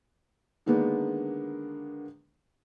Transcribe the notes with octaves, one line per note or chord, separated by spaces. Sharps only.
D3 D#3 G#3 A#3 B3 D4